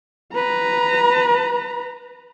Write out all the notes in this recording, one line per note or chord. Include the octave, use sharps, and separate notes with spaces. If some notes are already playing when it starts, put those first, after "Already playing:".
B4 A#5